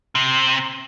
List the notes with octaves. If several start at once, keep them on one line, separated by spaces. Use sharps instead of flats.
C3